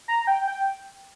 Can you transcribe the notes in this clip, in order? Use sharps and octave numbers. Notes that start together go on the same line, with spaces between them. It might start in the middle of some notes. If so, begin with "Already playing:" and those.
A#5
G5
G5